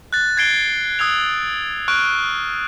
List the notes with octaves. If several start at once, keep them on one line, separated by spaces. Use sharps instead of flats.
F#6 A6
G#6 A6 C7 D7 G7
D#6 E6 G#6 F7
C#6 F6 F#6 D7